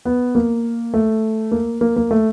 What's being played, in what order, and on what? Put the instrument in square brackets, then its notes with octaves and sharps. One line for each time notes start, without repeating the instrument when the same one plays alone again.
[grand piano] B3
A#3
A3
A#3
A#3
A#3
A3